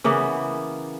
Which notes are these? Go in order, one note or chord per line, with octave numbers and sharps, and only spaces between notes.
C#3 E3 A#3 B3